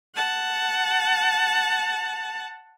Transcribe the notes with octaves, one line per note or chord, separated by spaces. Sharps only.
F#5 A5